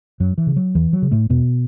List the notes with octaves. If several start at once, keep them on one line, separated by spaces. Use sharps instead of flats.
F#2 F#3
E3
C#3
F#3
E2 E3
F#3
C#3
A2 A3
E2 B2 B3